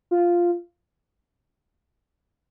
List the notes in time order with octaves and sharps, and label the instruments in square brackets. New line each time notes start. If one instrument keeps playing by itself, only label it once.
[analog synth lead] F4